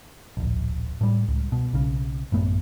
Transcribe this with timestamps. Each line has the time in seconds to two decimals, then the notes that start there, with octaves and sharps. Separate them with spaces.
0.37 D1 A#1
1.01 A2 G3
1.28 C#2
1.52 B2
1.73 B1 C#3
2.32 A1 F#2 A3 B3